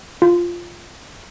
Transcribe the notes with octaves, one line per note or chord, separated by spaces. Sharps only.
F4